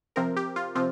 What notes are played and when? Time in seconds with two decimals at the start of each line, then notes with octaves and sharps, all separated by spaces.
0.16 C3 F3 C4 A#4
0.36 G4
0.56 F4
0.75 C3 F3 C4 F4